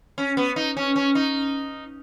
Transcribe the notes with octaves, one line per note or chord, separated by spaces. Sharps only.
C#4
B3
D#4
C#4
C#4
D#4